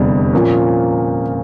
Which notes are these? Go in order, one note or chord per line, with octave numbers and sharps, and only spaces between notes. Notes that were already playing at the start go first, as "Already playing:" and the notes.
Already playing: F1 E2 D3 G3
A#2 F3 A#3 C#4